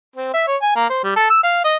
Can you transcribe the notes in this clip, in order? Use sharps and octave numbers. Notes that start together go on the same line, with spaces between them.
C4
E5
C#5
G#5
A#3
C5
G3
A4
E6
F5
D#5